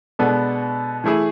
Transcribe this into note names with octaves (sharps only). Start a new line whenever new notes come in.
B2 G#3 B3 D4 A4
E3 A3 E4 G#4